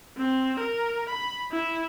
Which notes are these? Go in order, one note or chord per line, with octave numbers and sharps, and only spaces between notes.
C4
A#4
B5
E4